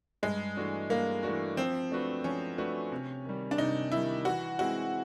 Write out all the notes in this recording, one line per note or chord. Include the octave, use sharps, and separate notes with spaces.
G2 G#3
E3 A3 D4 F#4
G2 A#3
E3 A3 D4 F#4
F3 C4
A3 D4 F#4 B4
F3 C#4
A3 D4 F#4 B4
C3
D#3 G3
D4
C3 D#4
D#3 G3 E4
E3 F#4
G#3 C4 E4 F#4